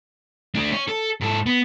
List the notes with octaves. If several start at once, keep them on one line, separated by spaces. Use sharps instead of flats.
A3 D4
C#4 C#5
A4
G#2 A4
B3